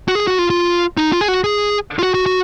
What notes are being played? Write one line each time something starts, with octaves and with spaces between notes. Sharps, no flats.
F#4
G#4
F#4
F4
F4
D#4
F4
G#4
F#4
G#4
F4
F#4
F#4
F#4